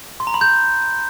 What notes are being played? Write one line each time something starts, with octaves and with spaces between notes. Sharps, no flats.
C6
A#5
B5
G6